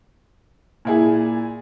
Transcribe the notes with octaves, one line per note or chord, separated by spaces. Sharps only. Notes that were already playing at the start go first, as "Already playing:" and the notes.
A#2 E4 G#4